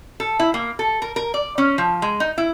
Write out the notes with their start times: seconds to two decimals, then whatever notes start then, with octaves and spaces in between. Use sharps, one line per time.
0.20 A4
0.40 E4
0.54 A#3
0.79 A4
1.02 A#4
1.16 A#4
1.34 D5
1.58 C#4
1.78 F3
2.02 G#3
2.20 D#4
2.38 E4